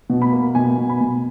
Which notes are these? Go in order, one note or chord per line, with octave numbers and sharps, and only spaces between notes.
B2
B5
A#3
B2 G#5
B2
B5
B2